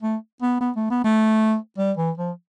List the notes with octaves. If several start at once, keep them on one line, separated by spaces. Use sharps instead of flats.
A3
B3
B3
A3
B3
A3
G3
E3
F3